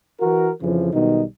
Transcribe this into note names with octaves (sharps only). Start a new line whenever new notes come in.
E3 F#4 A#4
F2 C#3 E3 F3
B1 B2 D#3 G3 D#4